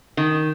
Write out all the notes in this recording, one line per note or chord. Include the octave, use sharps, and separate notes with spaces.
D#3